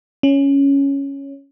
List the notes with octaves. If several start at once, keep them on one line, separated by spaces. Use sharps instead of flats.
C#4